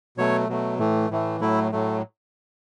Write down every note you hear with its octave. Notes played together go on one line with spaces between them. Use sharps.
B2 F#3 A3 C#5
B2 F#3 A3
A2 E3 A3
A2 E3 A3
A2 F#3 A3 E4
A2 F#3 A3